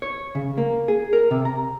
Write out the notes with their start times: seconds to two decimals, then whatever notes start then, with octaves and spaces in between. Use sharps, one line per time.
0.02 C#5
0.35 C#3
0.58 A#3
0.88 G#4
1.13 A#4
1.31 C3
1.45 A#5